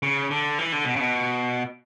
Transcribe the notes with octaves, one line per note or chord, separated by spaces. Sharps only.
C#3
D3
E3
D3
B2
C#3
B2